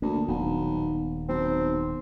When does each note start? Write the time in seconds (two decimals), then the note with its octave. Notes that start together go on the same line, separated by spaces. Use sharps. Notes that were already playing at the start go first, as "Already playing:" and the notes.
0.02 D2 A#3
0.28 D#1 B1
1.29 B1 C4